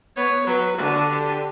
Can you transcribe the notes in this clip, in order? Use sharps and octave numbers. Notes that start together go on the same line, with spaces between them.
B3 C#5
F#3 B4
D3 F#4
G4